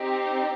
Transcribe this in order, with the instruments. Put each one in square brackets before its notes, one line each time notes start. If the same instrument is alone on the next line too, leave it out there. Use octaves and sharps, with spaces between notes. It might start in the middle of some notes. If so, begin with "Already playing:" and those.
Already playing: [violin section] C4 D#4 G4